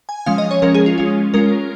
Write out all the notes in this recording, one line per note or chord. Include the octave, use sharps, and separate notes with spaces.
G#5
F3 G#3 C#4 F5
D#5
C#5
F3 G#3 C#4 A#4
G#4
F4
G#3 C#4 F4
G#3 C#4 F4 A#4